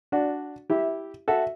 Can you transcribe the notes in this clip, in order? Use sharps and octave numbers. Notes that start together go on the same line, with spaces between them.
D4 F#4 D5
E4 G4 E5
F#4 A4 E5